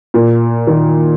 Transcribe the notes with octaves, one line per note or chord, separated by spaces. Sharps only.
A#2
D#3